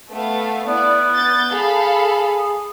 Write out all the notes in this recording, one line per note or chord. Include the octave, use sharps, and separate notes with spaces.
A3 B3 F5
B3 E4 D5
G6 A6
G#4 A4 F5 B5